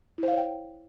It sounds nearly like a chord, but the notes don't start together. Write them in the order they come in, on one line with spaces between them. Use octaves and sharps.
E4 C5 F5 C#5 G5